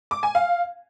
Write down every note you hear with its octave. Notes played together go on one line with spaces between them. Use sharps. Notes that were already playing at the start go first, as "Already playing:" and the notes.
D6
G#5
F5